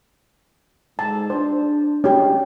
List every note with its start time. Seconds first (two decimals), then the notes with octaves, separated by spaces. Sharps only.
0.99 G#2 A5
1.30 D4 C5
2.04 C#4 G4